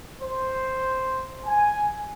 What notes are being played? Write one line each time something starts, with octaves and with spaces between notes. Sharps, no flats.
C5
G#5